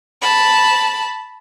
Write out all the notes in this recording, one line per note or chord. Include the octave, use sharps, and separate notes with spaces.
A5 B5